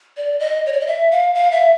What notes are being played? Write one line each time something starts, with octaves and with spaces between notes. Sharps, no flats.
D5
D#5
C#5
D5
D#5
E5
F5
F5
E5